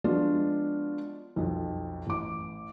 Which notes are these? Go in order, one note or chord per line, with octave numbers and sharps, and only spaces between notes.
F3 G#3 B3 D4 F4 F#4
B1 F2
A1 D6